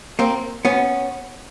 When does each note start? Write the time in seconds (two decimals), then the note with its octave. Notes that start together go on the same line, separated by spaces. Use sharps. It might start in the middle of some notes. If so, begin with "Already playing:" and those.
0.19 A#3 C4
0.65 B3 C#4